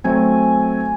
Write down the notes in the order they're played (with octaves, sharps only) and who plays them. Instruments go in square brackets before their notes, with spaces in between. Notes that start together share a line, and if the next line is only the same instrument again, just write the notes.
[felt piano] F#3 A3 C4 [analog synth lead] G#5